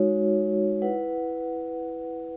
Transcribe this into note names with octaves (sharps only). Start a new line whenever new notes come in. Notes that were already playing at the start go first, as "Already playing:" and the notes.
Already playing: G#3 D#4 F#4 C#5
E4 B4 F#5